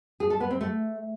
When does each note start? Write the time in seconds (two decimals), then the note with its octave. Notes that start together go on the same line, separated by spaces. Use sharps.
0.20 G#4
0.30 A4
0.40 B3
0.51 C4
0.61 A3